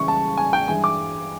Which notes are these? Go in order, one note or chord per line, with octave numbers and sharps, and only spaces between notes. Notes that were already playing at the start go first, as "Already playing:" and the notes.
Already playing: C#3 E3 G#3 C#6
A5
G#5
G5
G2 E3 G#3 G#5
D6